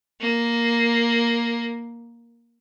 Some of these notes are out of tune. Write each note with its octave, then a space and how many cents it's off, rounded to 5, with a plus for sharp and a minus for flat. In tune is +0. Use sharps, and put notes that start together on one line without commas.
A#3 +5